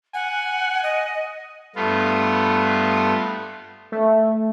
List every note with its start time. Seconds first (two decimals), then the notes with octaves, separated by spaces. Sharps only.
0.14 F#5 G#5
0.83 D#5
1.76 G2 A3 B3 F4
3.92 A3